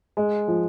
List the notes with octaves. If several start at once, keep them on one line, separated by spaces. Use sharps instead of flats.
G#3
F3